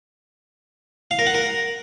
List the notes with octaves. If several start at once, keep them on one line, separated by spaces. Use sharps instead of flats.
F5
A#4
F#5
A#4